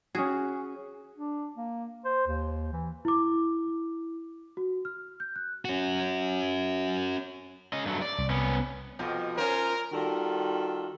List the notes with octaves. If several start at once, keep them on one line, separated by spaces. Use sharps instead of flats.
C#4 F#4 G#4
D4
A#3
C5
D#2
E3
E4 D6
F#4
F6
G6
F#6
C#4 F#4
C#4 D#5
G2 F#3 A3
D5
C2
B3 C#4
F2 B2 F3
C#4 F4 A#4 C5
D#3 G3 F4 F#4 A4